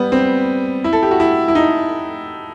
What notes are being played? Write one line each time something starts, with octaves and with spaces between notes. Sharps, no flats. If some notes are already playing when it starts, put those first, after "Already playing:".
Already playing: G3 B3
C4
E4
A4
G4
F#4
E4
E4
D#4